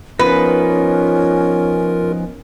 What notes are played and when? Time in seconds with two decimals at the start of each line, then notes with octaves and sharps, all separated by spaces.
0.19 F3 B3 C#4 D#4 F4 A#4 B4